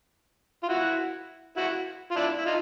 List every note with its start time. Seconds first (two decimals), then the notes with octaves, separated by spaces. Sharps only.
0.63 F4
0.68 E4 F#4
1.57 E4 F#4
2.11 F4
2.16 D4 E4
2.38 E4
2.46 D#4 F4